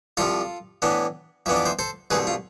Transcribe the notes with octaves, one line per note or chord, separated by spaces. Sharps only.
C2 C3 F3 F4 A4
A2 E3 B3 D4
F2 E3 B3 D4 E5
D5
C5 E5
A4 C5
C2 B2 A3 C4 G#4 B4
F4